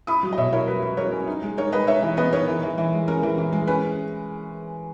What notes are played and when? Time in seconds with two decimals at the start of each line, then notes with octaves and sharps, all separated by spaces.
0.07 E4 B5 D#6
0.23 F#3
0.32 D#5
0.38 B2 C#5 E5
0.53 E4 A#4 C#5
0.68 F#3 B4
0.83 E4
0.97 F#3 A#4 C#5
1.12 C#4
1.27 D#4
1.42 G#3
1.58 D#4 A#4 C#5
1.72 G#3 B4 D#5
1.87 D#4 C#5 E5
2.02 E3
2.17 B3 B4 D#5
2.32 D#4 A#4 C#5
2.48 E3
2.63 E3
2.78 E3
2.93 G#3
3.08 C#4 A#4
3.23 E3
3.38 E3
3.53 G#3
3.67 C#4 B4